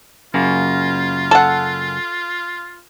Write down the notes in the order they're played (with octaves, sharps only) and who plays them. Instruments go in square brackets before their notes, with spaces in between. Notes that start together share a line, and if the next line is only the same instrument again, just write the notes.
[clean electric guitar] F#2 C#3 A#3 [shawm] F4
[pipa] A4 F#5